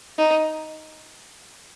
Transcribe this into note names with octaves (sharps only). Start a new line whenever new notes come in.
D#4